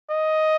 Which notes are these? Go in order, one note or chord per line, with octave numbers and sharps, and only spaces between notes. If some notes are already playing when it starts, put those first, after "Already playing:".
D#5